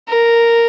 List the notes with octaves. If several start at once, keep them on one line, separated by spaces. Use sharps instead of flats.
A#4